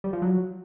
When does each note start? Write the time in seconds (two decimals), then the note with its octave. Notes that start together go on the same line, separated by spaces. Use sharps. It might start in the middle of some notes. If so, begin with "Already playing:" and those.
0.04 G3
0.13 F3
0.22 F#3